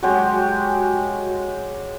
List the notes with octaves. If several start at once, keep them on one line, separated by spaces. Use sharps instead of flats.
F#3 G#3 F#4 G4